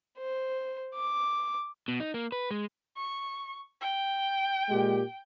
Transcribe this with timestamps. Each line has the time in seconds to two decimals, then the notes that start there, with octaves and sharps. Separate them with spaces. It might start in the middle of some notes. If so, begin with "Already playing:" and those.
0.18 C5
0.95 D6
1.88 B2
2.00 D#4
2.14 A#3
2.32 B4
2.51 G#3
2.97 C#6
3.81 G5
4.69 A#2 G#3 G4